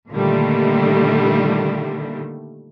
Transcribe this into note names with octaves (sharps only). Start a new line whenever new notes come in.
A#2 D3 D#3 G3 A3